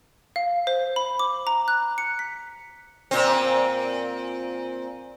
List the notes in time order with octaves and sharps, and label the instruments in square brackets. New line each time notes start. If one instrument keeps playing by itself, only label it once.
[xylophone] F5
C5
B5
D6
A#5
F#6
C#7
B6
[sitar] A#2 C4